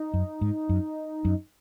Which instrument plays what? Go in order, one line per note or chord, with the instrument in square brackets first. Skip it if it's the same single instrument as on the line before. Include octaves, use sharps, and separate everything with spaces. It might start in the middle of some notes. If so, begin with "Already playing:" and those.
Already playing: [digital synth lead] D#4
[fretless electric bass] F#2
G#2
F#2
F#2